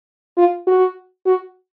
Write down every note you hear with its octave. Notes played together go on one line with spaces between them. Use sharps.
F4
F#4
F#4